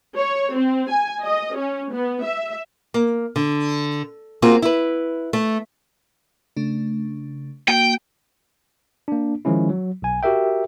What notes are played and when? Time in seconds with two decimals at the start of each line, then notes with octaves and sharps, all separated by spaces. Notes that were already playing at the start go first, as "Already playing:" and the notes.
0.17 C#5
0.53 C4
0.90 G#5
1.23 D#5
1.55 C#4
1.92 B3
2.24 E5
2.94 A#3
3.36 D3
4.42 A#3 C4 F4 F#4 G#4
4.62 E4 B4
5.33 A3
6.57 C#3 A3 D4
7.68 A#3 F#4 G5
9.08 A#3 D4
9.45 D#3 F3 G#3 C#4 E4
9.70 F#3
10.02 B1 G#5
10.23 F#4 G4 A#4 E5 G5